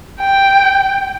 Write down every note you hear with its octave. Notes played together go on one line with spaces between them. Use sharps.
G5